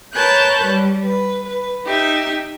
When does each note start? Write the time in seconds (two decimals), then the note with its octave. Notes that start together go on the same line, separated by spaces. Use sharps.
0.13 A#4 B4 C#5 A5 F#6 G6
0.65 G3
1.02 B4
1.46 B4
1.85 D#4 G4 E5